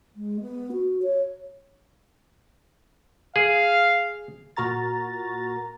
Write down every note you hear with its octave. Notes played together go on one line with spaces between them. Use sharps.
G#3
B3
F#4
C#5
G#4 F5
A#2 F#4 A#4 A#5 A6